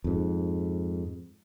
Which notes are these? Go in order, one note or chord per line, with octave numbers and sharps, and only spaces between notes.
F2 G#2